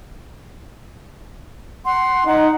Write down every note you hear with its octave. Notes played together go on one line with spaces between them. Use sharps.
F#5 C6
D#4 F#5